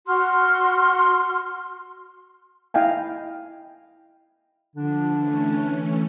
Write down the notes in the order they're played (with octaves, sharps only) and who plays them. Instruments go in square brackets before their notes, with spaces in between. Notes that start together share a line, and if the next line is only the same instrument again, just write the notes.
[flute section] F#4 C6 F6
[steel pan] E4 D#5 F5 G5 G#5
[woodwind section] D3 D4 [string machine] F3
[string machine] E3 A3 C#4